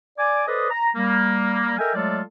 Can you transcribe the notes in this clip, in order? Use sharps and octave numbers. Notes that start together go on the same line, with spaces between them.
D5 G#5 D6
A4 B4 C5 D5 D#5
A#5
G3 A#3
A4 A#4 D#5 E5 G5 G#5
F#3 G#3 A3 F4 A4 D5